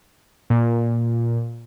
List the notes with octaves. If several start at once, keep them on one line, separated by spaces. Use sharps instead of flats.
A#2